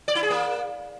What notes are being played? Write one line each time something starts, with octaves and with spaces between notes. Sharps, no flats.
D5
E4
G#4
A#3